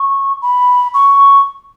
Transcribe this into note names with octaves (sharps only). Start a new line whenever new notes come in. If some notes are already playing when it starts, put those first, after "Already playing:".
Already playing: C#6
B5
C#6